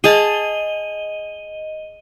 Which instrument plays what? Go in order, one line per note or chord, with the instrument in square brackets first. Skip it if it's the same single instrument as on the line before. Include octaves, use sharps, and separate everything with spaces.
[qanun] G#4 A5 [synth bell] D#5 D#7 G7